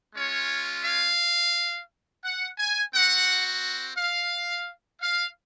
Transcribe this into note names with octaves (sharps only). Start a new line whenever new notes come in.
G#3 C#4 F4 C#5
F5
F#5
G#5
C4 F#4 F#5
F5
F5